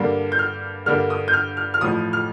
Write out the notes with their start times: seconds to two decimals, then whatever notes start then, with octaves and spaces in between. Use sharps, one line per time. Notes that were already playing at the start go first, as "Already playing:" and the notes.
Already playing: G2 D3 G3 A#3
0.32 G6
0.39 F6
0.86 G2 D3 G3 A#3 F6
1.10 D#6
1.28 G6
1.33 F6
1.57 F6
1.74 F6
1.81 A1 A2 F3 D#6
2.13 F6